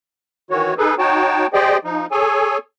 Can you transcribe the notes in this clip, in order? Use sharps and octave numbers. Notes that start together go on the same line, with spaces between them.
D#3 E3 F#4 C#5
D#4 G#4 A4 B4
D#4 F#4 C#5 G5 A5
G4 G#4 C5 D5 D#5 G5
F3 D#4
G#4 A4 C#5 G#5